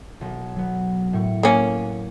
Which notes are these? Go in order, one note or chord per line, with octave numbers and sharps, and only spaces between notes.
B1
F#3 B3
A2 C#6
A#3 C#4